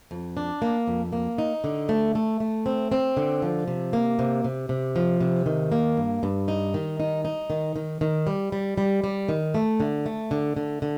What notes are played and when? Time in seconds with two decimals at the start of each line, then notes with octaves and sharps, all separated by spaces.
0.11 F2
0.37 D4
0.62 A#3
0.88 F2
1.13 A#3
1.38 D#4
1.64 D3
1.89 A3
2.15 A3
2.40 A3
2.66 C4
2.92 C4
3.17 D3
3.42 F3
3.68 C3
3.93 A#3
4.19 C3
4.44 C3
4.69 C3
4.96 F3
5.21 C3
5.46 D#3
5.72 A#3
5.97 G2
6.23 G2
6.48 D#4
6.74 D#3
7.00 D#4
7.25 D#4
7.50 D#3
7.76 D#3
8.01 D#3
8.27 G3
8.52 G3
8.78 G3
9.04 G3
9.29 D#3
9.55 A3
9.80 D3
10.06 A3
10.31 D3
10.57 D3
10.82 D3